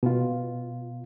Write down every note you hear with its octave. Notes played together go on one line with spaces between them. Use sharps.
B2 F4